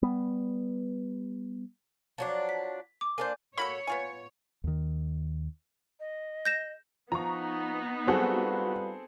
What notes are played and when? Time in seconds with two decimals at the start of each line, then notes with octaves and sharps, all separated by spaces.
0.02 G3 B3
2.18 F3 F#3 D4
2.49 B6
3.01 D6
3.18 A#3 D4 C5 G#5 G6
3.58 A#3 F#4 A4 C#5 B5
3.87 B3 F4 G#5
4.64 D#2 D#3
6.00 D#5
6.45 G6 A#6 E7
7.12 F3 B3 D#4 A#5 C#6
8.07 F#3 G3 C4 F4 F#4 G#4 A4 B4